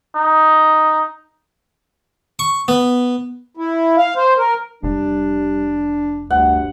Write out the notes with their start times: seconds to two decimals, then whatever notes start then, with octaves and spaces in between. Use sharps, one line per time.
0.16 D#4
2.39 C#6
2.68 B3
3.57 E4
3.97 F5
4.16 C5
4.37 A#4
4.83 F1 G3 D4
6.30 D2 G2 F#5